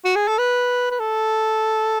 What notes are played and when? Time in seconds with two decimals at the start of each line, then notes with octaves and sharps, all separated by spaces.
0.05 F#4
0.15 G#4
0.28 A4
0.38 B4
0.91 B4
0.99 A4